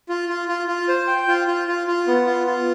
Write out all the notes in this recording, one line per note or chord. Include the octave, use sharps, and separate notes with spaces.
F4
F4
F4
F4
C5
G5
F4
F4
F4
F4
B3
F4
F4